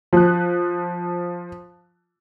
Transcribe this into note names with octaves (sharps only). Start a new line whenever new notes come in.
F3 F#6